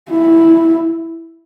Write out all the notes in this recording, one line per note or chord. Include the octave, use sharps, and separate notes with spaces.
E4